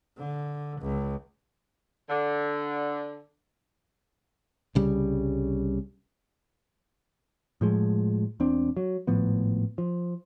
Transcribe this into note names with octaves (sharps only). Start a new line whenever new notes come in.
D3
C#2
D3
C2 C#3 G3
A2 F3 G#3
E1 B2 C4 D4
F#3
G#1 A2 F3 B3
F3